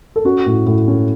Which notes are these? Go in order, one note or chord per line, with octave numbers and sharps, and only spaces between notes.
A4
C#4 F#4
A2
A2
C#4